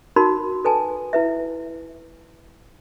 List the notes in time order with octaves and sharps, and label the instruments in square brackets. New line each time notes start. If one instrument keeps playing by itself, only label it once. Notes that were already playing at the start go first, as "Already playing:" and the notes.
[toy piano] D#4 F#4 A#4 B5 C6
A4 B4 G#5 A5
E4 B4 E5